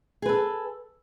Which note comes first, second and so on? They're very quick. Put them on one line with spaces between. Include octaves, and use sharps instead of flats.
G#4 B4 A4